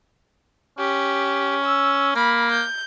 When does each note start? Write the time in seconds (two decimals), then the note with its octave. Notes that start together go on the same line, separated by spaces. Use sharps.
0.79 C#4 G4
1.64 E6
2.15 A#3 B5
2.52 G6